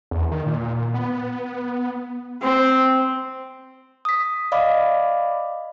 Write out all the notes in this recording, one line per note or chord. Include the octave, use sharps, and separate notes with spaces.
E2
D#3
A#2
B3
C4
D#6 B6
D5 D#5 F5 B5 D6